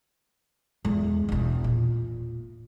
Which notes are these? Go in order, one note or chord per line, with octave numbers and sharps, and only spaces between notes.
E2 G#3
E1 E2
A#2